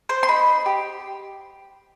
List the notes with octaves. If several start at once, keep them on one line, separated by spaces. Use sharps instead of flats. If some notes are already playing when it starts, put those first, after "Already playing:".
C5
C6
D#4 B5
G4